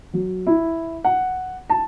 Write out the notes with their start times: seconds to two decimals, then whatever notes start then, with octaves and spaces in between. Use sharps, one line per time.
0.14 F#3
0.47 E4
1.04 F#5
1.70 A5